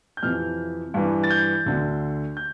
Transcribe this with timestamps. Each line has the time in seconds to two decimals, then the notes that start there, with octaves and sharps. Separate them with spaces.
0.17 G6
0.23 F2 C3 E3 F6
0.94 G2 E3
1.23 A6
1.30 G6
1.66 D2 D3
2.37 G6